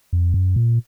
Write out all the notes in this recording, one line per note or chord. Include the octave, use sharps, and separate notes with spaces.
F2
F#2
A#2